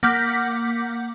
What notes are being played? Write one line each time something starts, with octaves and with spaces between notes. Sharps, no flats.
A#3 F#5 D6 F6 G6 B6